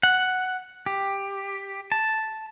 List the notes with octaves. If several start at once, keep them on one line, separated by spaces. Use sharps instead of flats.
F#5
G4
A5